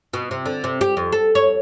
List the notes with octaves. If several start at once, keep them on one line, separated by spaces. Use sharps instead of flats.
B2
C3
D3
C3
G4
F2
A4
C#5